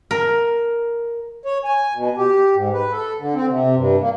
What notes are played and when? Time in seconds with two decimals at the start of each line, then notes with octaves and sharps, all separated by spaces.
0.11 A#4
1.46 C#5
1.65 G#5
1.95 B2
2.17 G4
2.55 G#2
2.73 B4
2.92 A4
3.19 D3
3.34 C4
3.49 C3
3.76 G2
4.01 A#3